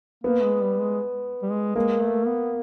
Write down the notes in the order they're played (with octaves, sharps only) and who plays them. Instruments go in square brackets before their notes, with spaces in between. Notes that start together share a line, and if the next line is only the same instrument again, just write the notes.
[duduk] A#3 [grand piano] B3
[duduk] G#3
G3
G#3
G3
G#3
[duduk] G#3 [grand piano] A#3
[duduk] A3
B3